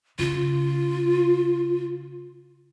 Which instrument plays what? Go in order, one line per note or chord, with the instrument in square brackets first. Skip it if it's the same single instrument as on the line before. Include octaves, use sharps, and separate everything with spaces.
[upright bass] C#3 [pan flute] F4